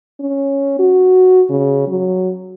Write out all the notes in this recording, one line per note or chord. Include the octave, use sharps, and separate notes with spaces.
C#4
F#4
C#3
F#3